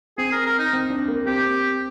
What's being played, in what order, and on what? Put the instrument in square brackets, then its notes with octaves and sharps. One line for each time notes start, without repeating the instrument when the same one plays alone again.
[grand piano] C4 [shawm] G#4
[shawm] A#4
A#4
D#4
[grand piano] C4
D4
A#3
[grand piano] C4 [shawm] G4